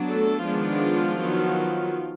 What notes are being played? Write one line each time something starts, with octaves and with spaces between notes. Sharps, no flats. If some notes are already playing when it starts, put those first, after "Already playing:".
Already playing: F#3 B3 D4
A3 A4
D#3 F3 G#3 B3 D4 F4
D#3 F#3 B3